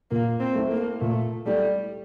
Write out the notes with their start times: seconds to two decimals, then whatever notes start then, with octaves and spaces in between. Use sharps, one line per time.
0.11 A#2 A#3
0.40 C4
0.55 A3 E4 A4
0.71 A#3
1.01 A#2 A3
1.46 G3 A3 E4 A4